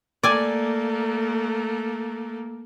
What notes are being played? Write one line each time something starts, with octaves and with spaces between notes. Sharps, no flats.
A3 A#3 D5 G#5